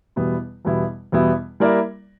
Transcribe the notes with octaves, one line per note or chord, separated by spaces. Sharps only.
E2 B2 G3 B3 E4
E2 B2 G3 B3 E4
E2 B2 G3 B3 E4
G3 A#3 E4 A#4 D5